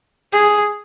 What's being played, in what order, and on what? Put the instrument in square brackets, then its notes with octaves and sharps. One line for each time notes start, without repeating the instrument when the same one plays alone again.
[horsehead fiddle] G#4